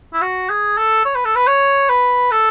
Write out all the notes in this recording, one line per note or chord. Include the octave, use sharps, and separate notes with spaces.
E4
F#4
G#4
A4
C#5
B4
A4
B4
C#5
B4
A4